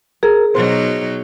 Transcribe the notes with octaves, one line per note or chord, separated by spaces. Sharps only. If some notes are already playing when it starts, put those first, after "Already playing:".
G#4 A#4
B2 F#3 D#4 C5